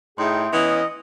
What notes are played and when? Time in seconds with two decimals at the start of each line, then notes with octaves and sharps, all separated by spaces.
0.18 A2 D#4 G#4 E5 G5 C6
0.53 E3 B3 C#4 D#5 D#6 C#7